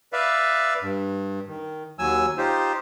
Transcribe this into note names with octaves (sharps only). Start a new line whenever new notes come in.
B4 D5 E5 F5
G2
D#3
D#2 F#3 G#5 E6
D#4 F4 G4 C5